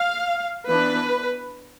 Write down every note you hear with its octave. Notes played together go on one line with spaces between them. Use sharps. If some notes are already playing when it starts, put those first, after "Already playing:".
Already playing: F5
E3 B3 D4 B4